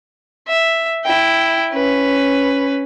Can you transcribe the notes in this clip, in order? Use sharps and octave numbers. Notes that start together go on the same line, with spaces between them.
E5
E4 G5
C#4 B4